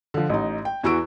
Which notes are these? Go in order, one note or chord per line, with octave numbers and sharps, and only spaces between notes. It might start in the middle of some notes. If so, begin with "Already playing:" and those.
D3 F3
A1 D#4
G5
E2 E3 F#4 C#6 E6 D7